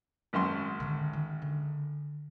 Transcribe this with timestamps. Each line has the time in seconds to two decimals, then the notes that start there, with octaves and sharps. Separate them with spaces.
0.33 G#1 F#2 C6
0.80 D3 D#3
1.13 D#3
1.42 D3